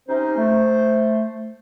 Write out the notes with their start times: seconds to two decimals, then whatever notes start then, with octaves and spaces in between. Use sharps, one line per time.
0.08 C3 C#4 D#4 C5
0.37 A3